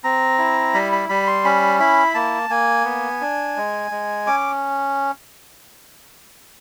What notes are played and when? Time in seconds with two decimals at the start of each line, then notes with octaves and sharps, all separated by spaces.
0.04 C4 A#5
0.38 E4
0.74 G3 B5
0.92 B5
1.09 G3 B5
1.27 C6
1.44 C#4 B5
1.79 E4 B5
2.14 A#3 A5
2.50 A#3 G#5
2.85 B3
3.21 D4
3.57 G#3
3.91 G#3
4.27 C#4 D6